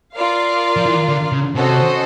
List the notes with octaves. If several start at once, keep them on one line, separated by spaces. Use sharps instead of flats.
F4 A#4 D5 F5
F3
E3
D3
C#3
C3 C#4 F#4 A4 C5 D#5